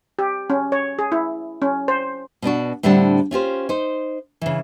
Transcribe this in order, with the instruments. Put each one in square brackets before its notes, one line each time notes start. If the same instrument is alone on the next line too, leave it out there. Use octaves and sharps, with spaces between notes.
[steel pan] G4
C#4
C#5
G#4
E4
C#4
C5
[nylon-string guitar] B2 B3 D4 F#4
A2 D3 G3 C4 D4 F#5
C#4 F4 G4 C5
D#4 C5
C#3 E3